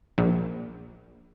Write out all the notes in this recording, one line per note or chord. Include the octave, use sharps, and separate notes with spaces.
A#1